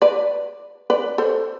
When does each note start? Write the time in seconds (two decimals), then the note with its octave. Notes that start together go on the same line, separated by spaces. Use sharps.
0.02 B4 D5
0.90 B4 D5
1.18 A4 C5